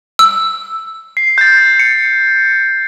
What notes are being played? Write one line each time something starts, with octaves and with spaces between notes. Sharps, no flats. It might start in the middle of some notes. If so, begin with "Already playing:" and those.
E6
C7
G6 A6
C#7